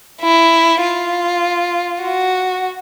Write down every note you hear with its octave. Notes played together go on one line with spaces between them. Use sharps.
E4
F4
F#4